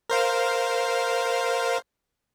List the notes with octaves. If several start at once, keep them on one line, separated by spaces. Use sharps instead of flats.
A#4 C5 F5